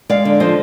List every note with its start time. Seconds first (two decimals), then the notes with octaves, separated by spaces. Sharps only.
0.09 G#3 D5 F5
0.25 D3
0.40 F3 C5 D#5